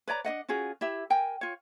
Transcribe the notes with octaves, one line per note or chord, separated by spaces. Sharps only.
B4 C#5 D5 A#5
D4 D#4 D#5 F#5
C#4 F4 F#4 G#4
E4 G4 E5
A#4 G5 G#5
F4 C#5